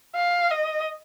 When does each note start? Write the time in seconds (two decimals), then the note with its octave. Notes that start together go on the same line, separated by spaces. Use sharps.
0.15 F5
0.51 D#5